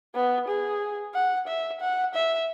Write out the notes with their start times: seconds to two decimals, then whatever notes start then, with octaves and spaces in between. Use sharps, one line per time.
0.15 B3
0.49 G#4
1.15 F#5
1.48 E5
1.81 F#5
2.15 E5